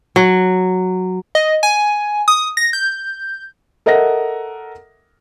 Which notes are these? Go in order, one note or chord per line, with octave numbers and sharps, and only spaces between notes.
F#3
D#5
G#5
D#6
A#6
G6
A4 A#4 D#5 E5 F#5 A#6